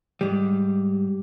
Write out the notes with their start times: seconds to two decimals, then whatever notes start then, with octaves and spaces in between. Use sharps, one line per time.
0.21 G#2 G3